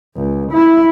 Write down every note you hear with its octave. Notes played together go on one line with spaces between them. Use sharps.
C#2
E4